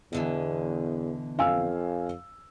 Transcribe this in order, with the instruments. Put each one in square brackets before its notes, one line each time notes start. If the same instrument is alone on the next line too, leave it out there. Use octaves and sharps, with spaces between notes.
[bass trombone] E2 [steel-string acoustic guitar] B2 D3 E3
[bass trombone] F2 [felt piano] F5 G#5 E6